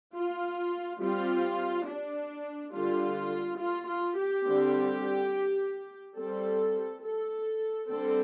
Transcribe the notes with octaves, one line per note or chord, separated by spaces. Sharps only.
F4
G3 C4 F4
D4
D3 G3 D4 F4
F4
F4
G4
D3 G3 C4
G3 C4 A4
A4
D3 G3 C4 A4